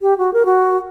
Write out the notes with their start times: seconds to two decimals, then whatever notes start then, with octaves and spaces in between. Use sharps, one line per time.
0.02 G4
0.18 F#4
0.33 A#4
0.45 F#4